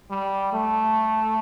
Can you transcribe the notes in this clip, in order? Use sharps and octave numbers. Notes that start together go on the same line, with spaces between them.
G3
A3